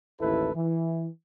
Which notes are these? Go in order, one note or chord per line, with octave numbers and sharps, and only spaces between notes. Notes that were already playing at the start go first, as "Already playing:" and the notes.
A1 D#2 E4 A4 B4
E3